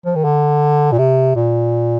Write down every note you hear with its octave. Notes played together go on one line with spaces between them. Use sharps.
F3
D#3
D3
A#2
C3
A#2